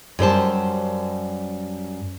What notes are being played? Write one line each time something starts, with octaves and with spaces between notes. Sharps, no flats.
F#2 G3 C5 A5